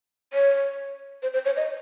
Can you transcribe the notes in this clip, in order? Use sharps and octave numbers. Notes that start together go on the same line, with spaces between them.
C#5
C5
C5
C#5
D#5